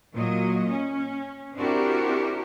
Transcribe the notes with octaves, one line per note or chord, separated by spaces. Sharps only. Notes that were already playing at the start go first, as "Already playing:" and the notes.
A#2 F#3 D#5
C#4
C4 D4 E4 F#4 G4 A#4